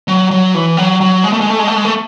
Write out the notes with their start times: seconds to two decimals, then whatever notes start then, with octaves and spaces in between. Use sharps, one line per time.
0.08 F#3
0.31 F#3
0.55 E3
0.77 F#3
1.01 F#3
1.24 G#3
1.33 A3
1.41 G#3
1.50 A3
1.59 G#3
1.67 A3
1.76 G#3
1.85 A3